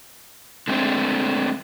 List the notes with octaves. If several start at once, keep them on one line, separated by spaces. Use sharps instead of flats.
D3 G#3 A3 C4 D4 C5